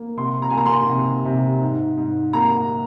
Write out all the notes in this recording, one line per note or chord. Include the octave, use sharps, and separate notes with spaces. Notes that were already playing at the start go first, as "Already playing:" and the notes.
Already playing: A#3
C3 C6
A#5
G#5
A#3 A#5
C6
C3
C3
G#2
G#2
A#3 A#5